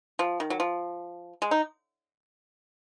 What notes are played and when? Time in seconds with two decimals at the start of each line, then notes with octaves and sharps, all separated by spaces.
0.19 F3
0.40 D#3
0.50 F#3
0.60 F3
1.42 G#3
1.51 D#4